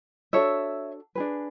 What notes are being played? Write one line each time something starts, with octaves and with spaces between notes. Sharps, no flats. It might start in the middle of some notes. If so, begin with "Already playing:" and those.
D4 F#4 A4 C#5 E5
D4 G#4 B4